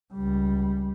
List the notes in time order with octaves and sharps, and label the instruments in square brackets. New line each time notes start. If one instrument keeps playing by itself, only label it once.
[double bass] C#2 G3